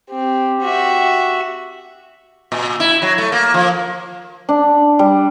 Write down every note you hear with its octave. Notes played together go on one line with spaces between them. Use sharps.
C4 G4
F#4 E5
A#2
E4
F#3
A3
A#3
F3
D4
G3